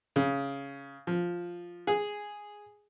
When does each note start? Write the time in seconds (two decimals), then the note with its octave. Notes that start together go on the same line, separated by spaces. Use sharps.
0.16 C#3
1.07 F3
1.87 G#4